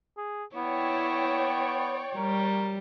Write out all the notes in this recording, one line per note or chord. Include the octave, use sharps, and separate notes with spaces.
G#4
B3 E4 C#5 D5 G5
G3 A#4